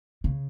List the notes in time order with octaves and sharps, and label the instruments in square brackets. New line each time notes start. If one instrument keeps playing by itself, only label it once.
[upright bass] C#3